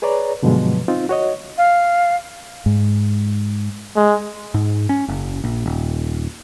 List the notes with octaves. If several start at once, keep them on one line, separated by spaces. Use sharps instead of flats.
G#4 B4 C#5 D5 A#5
G2 B2 D3 F3 F#3 G#3
C4 D#4 F4
F#4 C#5 D#5
F5
G#2
G#3
G#2
C#4
F#1
A#1
D#1